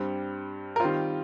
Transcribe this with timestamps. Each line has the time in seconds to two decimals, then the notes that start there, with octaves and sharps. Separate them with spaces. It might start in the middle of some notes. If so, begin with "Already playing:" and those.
Already playing: G2 G3 C4
0.76 A#4
0.80 D#3 G3 C4 F4 C5